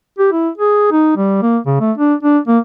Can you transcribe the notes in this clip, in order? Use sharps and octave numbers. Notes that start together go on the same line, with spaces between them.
G4
E4
G#4
D#4
G3
A#3
C#3
A3
D4
D4
A#3